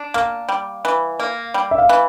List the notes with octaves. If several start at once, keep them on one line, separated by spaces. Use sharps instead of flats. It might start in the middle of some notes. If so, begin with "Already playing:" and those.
Already playing: D4
A#3 F5
G3
E3
A#3
G3
E5
F5
E3